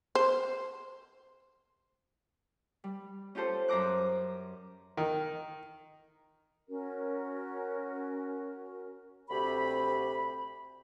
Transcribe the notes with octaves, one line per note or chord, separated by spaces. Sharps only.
C5
G3
C#4 F4 G4 A4 C5
F#2 C5 A#5 D6 F#6
D#3
C#4 F#4 A#4
D2 C3 C4 G4 B5